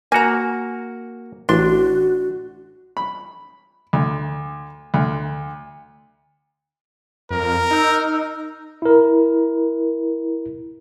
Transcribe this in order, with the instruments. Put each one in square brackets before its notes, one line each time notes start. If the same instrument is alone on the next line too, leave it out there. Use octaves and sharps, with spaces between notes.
[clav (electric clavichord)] A#3 F#4 [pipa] G#5 A#5
[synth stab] A1 [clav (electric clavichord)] D4 [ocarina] F#4 [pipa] C6
[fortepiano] B5
D2
D2
[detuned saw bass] F2 [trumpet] A#4
[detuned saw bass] D#4 [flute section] E6 G6
[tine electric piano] E4 A#4